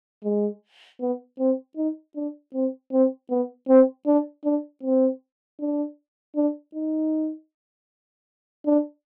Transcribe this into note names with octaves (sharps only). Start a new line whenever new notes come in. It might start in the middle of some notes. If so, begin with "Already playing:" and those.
G#3
B3
C4
D#4
D4
C4
C4
B3
C4
D4
D4
C4
D4
D4
D#4
D4